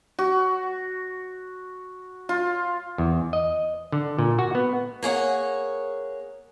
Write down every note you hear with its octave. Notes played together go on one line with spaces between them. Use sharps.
F#4
F4
E2
D#5
D3
A#2
F#4
B3
A#3 G#4 C#5 F#5